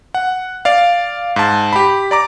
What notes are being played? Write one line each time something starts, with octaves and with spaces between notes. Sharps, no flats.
F#5
D5 F5
G#2 A5
G4 B5
D5 A#5 D6